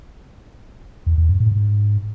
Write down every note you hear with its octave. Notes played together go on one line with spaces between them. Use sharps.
E2
E2
F#2
A2
G#2